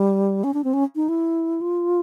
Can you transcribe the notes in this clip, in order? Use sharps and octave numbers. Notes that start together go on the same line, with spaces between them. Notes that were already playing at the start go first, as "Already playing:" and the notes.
Already playing: G3
C#4
D4
C4
C#4
D#4
E4
F4